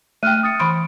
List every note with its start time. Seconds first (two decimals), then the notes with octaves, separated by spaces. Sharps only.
0.23 A3 G5 F6 F#6 D#7
0.43 D#6 A6 C#7
0.60 E3 B5 C6 D7